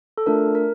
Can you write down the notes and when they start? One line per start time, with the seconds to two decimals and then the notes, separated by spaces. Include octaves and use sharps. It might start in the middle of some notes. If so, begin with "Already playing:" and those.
0.18 A4
0.26 A3 D4 F4 A#4
0.55 A#4